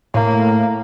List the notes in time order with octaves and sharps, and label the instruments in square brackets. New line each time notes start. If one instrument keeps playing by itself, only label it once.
[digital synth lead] A2 [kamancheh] A#3